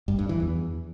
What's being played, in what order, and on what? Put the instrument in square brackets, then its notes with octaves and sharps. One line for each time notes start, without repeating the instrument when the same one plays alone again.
[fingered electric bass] G2
G2
E3
E2